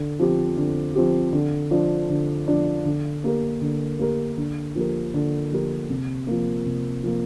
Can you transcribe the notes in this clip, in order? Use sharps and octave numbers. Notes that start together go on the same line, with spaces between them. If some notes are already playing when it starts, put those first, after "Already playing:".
Already playing: D3
F3 C4 G4
D3
F3 C4 G4
D3
F3 D4
D3
F3 D4
D3
A#3 G4 A#4
D3
A#3 G4 A#4
D3
F3 A#3 G4 A#4
D3
F3 A#3 G4 A#4
C3
F3 A#3
C3
F3 A#3